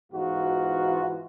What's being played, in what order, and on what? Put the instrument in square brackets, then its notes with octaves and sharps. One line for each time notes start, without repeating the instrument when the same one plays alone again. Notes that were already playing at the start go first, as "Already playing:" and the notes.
[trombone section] G#2 B2 E3 D#4 F4 F#4